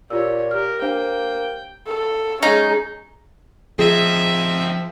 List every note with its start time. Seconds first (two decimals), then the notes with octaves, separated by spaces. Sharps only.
0.10 A#2 F4 G4 C#5 E6
0.51 G4 A#4 F6
0.82 A#3 D4 C5 G5
1.87 A4
2.43 G#3 C#4 D#4 G#4
3.79 F3 C4 D#4 G#4 E5